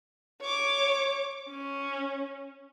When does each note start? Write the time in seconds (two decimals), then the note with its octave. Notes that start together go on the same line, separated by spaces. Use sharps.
0.41 C#5 D6
1.49 C#4